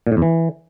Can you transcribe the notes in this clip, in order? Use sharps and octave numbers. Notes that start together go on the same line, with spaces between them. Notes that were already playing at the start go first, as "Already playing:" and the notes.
A#2
A2
E2
E3